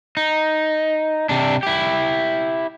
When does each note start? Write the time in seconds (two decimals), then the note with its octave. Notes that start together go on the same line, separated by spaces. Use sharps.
0.17 D#4
1.29 C3 D4
1.63 E4 G4